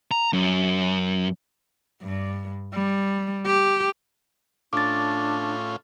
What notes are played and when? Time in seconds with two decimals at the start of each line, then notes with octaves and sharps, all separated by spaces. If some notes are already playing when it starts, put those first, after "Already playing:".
0.11 A#5
0.33 F#2
2.03 G2
2.73 G3
3.46 G4
4.73 A2 C#4 D4 F4 D6 A6